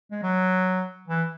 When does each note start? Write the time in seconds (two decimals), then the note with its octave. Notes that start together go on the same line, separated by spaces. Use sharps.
0.12 G#3
0.23 F#3
1.08 E3